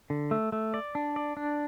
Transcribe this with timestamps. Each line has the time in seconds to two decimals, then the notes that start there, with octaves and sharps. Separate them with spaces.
0.10 D3
0.31 A3
0.52 A3
0.74 D5
0.95 D4
1.16 D5
1.37 D4